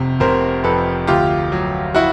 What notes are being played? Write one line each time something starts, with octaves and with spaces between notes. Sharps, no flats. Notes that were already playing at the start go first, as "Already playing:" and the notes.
Already playing: F1 C3
F1 A#4 C5
F2 A4 B4
D2 F4 G4
F#3
E4 F#4